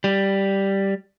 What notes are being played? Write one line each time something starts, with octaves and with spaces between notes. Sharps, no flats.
G3